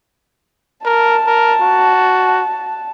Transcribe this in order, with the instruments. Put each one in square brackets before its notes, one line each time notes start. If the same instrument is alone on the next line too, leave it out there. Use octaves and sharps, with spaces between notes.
[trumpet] A#4 [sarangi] A5
[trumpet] A#4
F#4